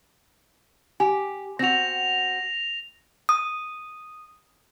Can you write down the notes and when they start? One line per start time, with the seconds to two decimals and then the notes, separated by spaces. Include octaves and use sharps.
1.00 G4 G#5
1.59 C4 F#4 A#6 F7
3.29 D#6